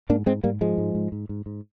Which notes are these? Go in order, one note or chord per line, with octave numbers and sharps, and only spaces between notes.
G#2 A#3 D4
G#2 G#3 C4
G#2 G3 A#3
G#2 F3 G#3
G#2
G#2
G#2
G#2
G#2